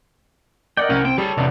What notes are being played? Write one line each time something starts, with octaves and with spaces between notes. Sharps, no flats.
A#4 D5 D#5 F#5 G5
C2 C#4
C4 G5
G3 G#4 A4 C#5 A5
A1 E2 C3 D4